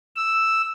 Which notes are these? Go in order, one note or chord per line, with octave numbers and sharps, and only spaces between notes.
E6